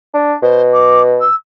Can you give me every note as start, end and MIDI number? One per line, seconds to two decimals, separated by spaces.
0.14 0.35 62
0.43 1.24 47
0.43 0.61 72
0.73 1.02 86
1.20 1.34 88